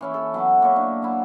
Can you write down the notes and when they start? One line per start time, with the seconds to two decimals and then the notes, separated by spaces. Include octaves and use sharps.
0.01 E3 C#4 E4
0.14 A4
0.34 F#3 B3 E4 F#4
0.62 A#3 C#5 E5
0.76 D4
1.02 F#3 E4